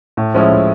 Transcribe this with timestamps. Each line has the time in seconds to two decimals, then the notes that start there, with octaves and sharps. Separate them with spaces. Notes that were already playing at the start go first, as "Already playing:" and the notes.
0.17 A2
0.34 F3 G#3 C#4 E4
0.52 A2